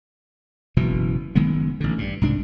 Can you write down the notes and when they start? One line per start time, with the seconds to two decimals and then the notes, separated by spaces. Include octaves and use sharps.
0.77 F#1 B2 E3
1.35 F#1 D#3 G#3 B3
1.80 A1 D3
1.98 G2
2.22 C2 G#2 D4